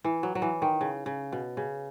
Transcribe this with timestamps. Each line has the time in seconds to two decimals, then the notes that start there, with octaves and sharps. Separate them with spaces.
0.04 E3
0.23 F#3
0.35 F#3
0.42 E3
0.62 D#3
0.81 C#3
1.06 C#3
1.32 B2
1.57 C#3